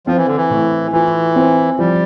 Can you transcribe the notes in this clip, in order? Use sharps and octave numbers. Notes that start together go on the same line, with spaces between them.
F3 C4
E3
D3
E3
A2
E3 F4
C4
F3 G3